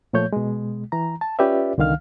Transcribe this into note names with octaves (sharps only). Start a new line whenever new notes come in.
A#2 F3 A3 C#5 G6
B2 G#3
E3 A#5
A5
C#4 F4 G4 B4 D5 E5
C2 D3 D#3 F5 F6